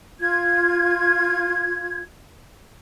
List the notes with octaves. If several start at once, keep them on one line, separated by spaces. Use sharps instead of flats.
F4 G#6